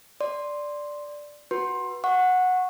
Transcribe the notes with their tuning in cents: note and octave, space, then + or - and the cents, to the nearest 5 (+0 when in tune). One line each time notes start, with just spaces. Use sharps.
D5 +0 C6 +0
F#4 +0 B4 -20 C6 +20
F#5 -10 C#6 -15